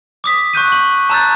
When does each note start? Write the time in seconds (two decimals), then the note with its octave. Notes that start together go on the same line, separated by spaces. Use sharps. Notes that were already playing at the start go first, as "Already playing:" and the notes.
0.24 D6 D#6 B6
0.53 C#6 F#6 G6 D#7
0.72 F#7
1.10 A5 A#5 E6 F#6 G6 A6